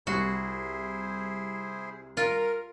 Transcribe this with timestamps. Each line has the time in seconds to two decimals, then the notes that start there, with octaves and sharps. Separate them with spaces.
0.07 C2 E4 F#4 G#4 C5
2.17 F4 A#4